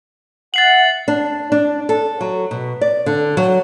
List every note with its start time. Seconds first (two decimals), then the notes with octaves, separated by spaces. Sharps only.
0.54 E5 F#5 A6 C7 F#7
1.08 D4
1.52 D4
1.89 A4
2.21 F#3
2.51 B2
2.81 D5
3.06 D3
3.37 F#3